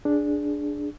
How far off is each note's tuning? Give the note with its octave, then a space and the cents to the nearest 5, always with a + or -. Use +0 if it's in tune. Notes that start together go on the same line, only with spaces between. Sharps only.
D4 +0 G#4 +0